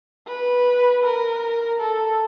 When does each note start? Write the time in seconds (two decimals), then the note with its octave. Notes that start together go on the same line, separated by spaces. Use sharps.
0.28 B4
1.04 A#4
1.80 A4